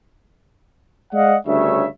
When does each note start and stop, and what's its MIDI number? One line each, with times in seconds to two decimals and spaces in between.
1.14 1.36 56
1.14 1.36 74
1.14 1.36 75
1.14 1.36 77
1.14 1.36 78
1.47 1.86 38
1.47 1.86 43
1.47 1.86 49
1.47 1.86 73
1.47 1.86 76